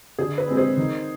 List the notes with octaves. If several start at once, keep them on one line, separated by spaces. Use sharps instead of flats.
D3 G#4
B4
G#3 C4
G#4 C5
D#3